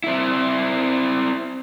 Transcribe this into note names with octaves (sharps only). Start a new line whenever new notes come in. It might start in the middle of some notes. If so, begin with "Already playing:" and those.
C4 E4